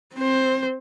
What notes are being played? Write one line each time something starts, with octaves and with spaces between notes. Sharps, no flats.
C4 C5